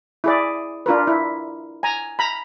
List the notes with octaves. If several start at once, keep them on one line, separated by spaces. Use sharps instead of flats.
E4 G#4 D5
D4 F4 A#4 B4
E4
G#5 A#5
A#5 B5